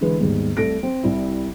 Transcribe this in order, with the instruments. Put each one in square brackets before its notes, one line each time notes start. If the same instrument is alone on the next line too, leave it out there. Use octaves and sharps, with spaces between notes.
[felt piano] D3 E3 G#3 G#4 B4
D#2 G#2 G3 B3
C2 A3 A4 A#6 D7
C4
C2 G3 E4